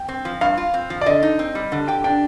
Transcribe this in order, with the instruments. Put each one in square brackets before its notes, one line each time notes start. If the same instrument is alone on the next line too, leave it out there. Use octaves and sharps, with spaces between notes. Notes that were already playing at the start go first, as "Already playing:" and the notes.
Already playing: [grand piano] G5
[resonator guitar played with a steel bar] C4
F3
[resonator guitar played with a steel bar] G2 [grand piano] F5
[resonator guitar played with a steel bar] F4
C4
F3
[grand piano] D5
[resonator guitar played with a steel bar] D3 [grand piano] D#5
[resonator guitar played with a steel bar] D#4
C4
G3
D3
[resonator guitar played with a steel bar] G4 [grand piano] G5
[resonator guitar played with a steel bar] D4 [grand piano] G5